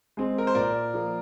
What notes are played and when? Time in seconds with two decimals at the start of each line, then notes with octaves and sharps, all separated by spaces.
0.17 G#3 C4
0.38 A#4
0.47 C5
0.55 A#2 A#4 D5
0.94 F3 A#3